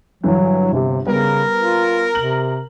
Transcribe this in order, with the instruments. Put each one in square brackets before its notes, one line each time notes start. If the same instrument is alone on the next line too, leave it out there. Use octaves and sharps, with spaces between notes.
[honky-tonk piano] G2 D3 E3 [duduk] F#3
[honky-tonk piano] G1 [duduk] C3
[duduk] C#3 [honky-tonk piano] G3 B3 [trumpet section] A#4
[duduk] F4
[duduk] C3 [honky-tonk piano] F#7